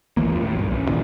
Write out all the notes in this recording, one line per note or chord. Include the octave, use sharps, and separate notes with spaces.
G1 D#3 E3 A#3
D#2 F3
A2
B1 G2
A1
A#2 D#3 E3